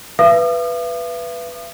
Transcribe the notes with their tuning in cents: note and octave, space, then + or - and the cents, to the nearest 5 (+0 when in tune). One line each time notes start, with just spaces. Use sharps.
B4 +0 E5 +45 D#6 -45